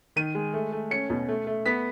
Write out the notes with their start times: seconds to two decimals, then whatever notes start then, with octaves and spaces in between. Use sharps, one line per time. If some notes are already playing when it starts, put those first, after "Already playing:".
0.16 D#3 D#7
0.35 G#3
0.54 A3
0.72 A3
0.91 C#4 C#7
1.10 B2
1.28 A3
1.47 A3
1.66 B3 B6